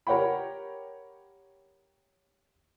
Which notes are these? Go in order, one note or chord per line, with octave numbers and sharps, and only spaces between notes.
G4 A#4 C#5 F#5 G5 B5